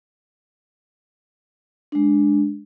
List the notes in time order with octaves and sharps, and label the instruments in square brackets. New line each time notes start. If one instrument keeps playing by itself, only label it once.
[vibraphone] G#3 D4